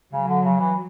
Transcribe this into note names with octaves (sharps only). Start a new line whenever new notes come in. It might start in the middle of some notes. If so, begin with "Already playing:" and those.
C#3 F#3
D3
C#3
E3